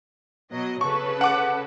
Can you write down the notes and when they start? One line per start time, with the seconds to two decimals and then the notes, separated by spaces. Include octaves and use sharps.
0.52 B2 F#3 D#5
0.81 C#3 A4 B4 C#6
1.21 F#5 D6